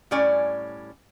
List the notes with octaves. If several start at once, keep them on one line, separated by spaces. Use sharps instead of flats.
A2 G3 C#4 D5 G#5